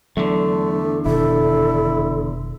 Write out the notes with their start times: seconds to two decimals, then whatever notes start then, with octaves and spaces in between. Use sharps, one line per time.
0.17 E2 D3 F#3 A3
1.06 F1 B2 D#3 E4 A4